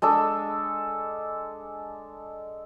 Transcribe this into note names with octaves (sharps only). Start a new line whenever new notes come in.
G#3 D4 A4